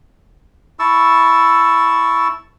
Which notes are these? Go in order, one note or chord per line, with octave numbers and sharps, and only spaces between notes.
E4 A5 C#6 E6